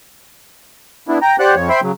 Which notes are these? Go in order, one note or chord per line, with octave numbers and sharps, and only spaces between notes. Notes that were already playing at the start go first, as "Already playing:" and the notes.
B3 D4 E4
G5 A#5
G4 C5 D5 F#5 F#6
F2 F3 C#5
C5 E5 G5 B5 C6
C#3 F#3